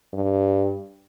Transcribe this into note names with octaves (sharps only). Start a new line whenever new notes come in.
G2